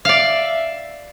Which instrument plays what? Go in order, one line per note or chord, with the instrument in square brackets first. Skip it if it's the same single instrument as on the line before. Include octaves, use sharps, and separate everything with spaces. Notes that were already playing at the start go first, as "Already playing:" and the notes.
[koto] D5 F5 [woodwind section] E5